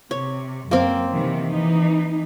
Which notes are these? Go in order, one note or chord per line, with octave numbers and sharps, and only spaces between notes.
C3 C#5
F#2 A#3 C4
C3 D#3 E3
E3 D#4